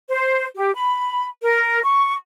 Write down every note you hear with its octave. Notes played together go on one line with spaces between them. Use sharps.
C5
G4
B5
A#4
C#6